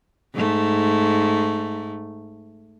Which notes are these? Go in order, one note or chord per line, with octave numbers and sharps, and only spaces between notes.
G#2 A3